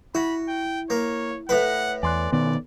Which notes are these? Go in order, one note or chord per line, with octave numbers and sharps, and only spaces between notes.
E4 F#4 B5
G5
A#3 C#5
A2 B4 F#5
E2 D5 G#5 C6 F#6
B2 D#3 B3 D5